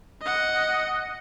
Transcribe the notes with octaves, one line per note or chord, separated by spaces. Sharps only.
D#5 F#5